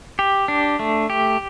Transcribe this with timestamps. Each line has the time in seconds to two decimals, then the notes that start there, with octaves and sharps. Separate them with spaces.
0.19 G4
0.48 D4
0.79 A3
1.10 G4